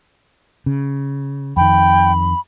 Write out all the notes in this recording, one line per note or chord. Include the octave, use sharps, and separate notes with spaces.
C#3
F2 D#3 G5 B5